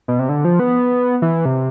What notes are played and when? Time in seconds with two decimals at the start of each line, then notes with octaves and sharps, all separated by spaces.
0.08 B2
0.19 C3
0.29 D3
0.45 F3
0.59 B3
1.22 E3
1.45 C3